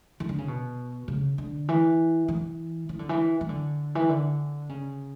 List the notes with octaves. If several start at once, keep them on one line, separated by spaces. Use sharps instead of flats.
E3
D3
C#3
B2
C#3
D3
E3
E3
E3
D3
E3
E3
D3
E3
D3
C#3